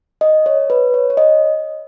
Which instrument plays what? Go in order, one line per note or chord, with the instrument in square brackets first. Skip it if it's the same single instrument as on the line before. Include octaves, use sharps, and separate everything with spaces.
[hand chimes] D#5
C#5
B4
C#5
C#5
D#5